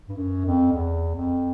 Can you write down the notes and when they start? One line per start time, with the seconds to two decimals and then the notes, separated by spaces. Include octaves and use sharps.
0.09 G2
0.17 F#2
0.46 F2
0.73 E2
1.15 F2